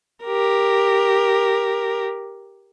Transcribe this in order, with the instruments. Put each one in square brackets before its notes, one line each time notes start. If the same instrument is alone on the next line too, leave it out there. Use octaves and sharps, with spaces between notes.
[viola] G4 A#4